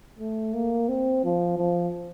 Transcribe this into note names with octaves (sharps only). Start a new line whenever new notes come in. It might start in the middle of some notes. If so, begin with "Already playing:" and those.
A3
A#3
C4
F3
F3